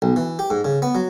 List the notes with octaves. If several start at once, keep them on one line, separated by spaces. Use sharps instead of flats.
B1
E3
G4
G#2
C#3
B3
F#3